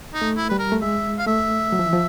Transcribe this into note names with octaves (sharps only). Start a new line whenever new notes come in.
D#4
A3
E4
G3 B4
A#4
A3
G#3 E5
F5
A3 E5
F#3
F3
E3
F3